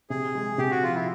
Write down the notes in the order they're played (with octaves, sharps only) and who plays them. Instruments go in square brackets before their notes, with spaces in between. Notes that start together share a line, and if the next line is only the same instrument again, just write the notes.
[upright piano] C3 [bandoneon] G#4
[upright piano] G#3
[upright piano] C3 [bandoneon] G4
[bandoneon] F#4
[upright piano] F3 [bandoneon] F4
[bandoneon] E4